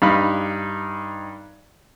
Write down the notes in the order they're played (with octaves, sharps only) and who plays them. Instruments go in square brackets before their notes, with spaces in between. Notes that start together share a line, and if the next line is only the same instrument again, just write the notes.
[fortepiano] G2 D#4 F5 B5